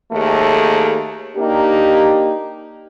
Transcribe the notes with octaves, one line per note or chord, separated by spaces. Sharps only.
D#2 A3 G#4 A4
A#3 D4 D#4 G4